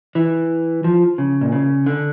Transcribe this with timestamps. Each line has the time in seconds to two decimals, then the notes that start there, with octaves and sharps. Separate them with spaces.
0.15 E3
0.84 F3
1.18 C#3
1.41 A#2
1.52 C#3
1.86 D3